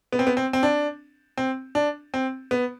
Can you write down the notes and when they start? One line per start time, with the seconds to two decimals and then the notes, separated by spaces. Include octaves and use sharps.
0.13 B3
0.19 C4
0.27 B3
0.37 C4
0.53 C4
0.63 D4
1.37 C4
1.75 D4
2.14 C4
2.51 B3